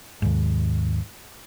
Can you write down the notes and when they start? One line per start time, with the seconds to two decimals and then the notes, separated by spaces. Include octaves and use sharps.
0.22 D#2 G#2